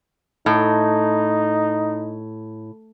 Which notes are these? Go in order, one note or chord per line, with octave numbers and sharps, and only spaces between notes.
A2 D#4